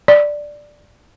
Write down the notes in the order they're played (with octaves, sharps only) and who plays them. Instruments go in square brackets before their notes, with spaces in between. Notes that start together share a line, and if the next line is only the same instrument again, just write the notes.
[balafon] D5